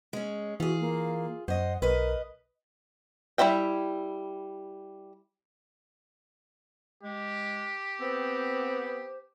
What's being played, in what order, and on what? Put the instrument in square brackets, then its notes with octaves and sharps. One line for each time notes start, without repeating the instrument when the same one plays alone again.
[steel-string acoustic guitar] G#3 C#4
[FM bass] E3 [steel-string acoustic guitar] F4 G#4 [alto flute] F#4
[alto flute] A#3
[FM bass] F#2 [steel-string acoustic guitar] C5 D#5 [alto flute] F#5
[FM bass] B1 [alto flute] A#4 [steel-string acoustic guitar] B4 D#5
[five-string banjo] G3 E4 C5 E5 G5
[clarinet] G#3 [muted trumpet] G4
[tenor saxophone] B3 [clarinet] C4 [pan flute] C5